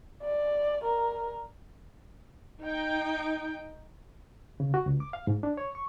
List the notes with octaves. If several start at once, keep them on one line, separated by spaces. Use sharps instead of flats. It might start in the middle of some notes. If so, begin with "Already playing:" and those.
D5
A#4
D#4 G5
C#3
F#4
C#2
D6
F5
G#2
D4
C#5
C#6